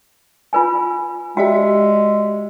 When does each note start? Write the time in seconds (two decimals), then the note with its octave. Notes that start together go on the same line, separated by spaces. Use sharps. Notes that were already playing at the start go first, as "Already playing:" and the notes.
0.53 F4 B4 G#5
1.37 G#3 F#4 G4 D5 E5 G5